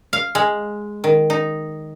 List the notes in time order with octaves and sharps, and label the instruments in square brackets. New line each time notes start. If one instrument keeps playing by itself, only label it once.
[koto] F5
G#3
D#3
D#4